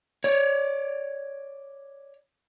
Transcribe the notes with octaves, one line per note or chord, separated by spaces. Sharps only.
C#5 D5